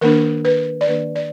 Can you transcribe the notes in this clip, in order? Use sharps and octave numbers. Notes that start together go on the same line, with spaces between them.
D#3 A#3 D4 A#4
B4
D5
D#3 A#3 D4 B4
D5